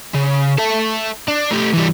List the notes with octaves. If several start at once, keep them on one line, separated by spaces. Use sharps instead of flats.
C#3
A4 E5
D4
A3 G4
E3 G3